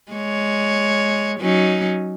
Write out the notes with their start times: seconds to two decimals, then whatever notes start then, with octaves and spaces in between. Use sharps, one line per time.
0.12 G#3 C#5
1.39 F#3 C#4 D#4